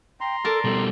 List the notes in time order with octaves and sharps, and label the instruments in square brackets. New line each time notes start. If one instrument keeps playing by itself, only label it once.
[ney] G5 [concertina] A#5 C6
[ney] A4 [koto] A#4 D5 A5
[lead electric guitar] B2 G3 [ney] A4